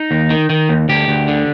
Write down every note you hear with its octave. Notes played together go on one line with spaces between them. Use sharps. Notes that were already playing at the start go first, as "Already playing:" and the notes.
Already playing: D#4
D#2
D#3
D#3
D#2
D2 G4
D2
D3